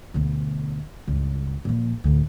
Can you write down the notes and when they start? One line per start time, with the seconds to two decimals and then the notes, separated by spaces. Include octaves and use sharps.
0.14 D2 B2
1.07 C#2 G2
1.65 A#2 F3
2.04 D2 A2